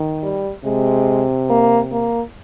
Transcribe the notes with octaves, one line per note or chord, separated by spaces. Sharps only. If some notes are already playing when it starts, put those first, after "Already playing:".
Already playing: D#3
G3
C3 G#3
A#3
A#3